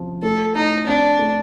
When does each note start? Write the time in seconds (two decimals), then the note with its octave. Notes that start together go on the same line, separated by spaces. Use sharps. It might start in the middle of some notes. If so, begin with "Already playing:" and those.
Already playing: C3 F3
0.22 A3 A4
0.55 A2 D#4
0.87 C4 D4
1.19 A3